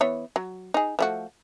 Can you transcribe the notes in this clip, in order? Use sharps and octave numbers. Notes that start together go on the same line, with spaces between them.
E3 B3 C#5
F#3
D#4 G#4
F3 A3 F#4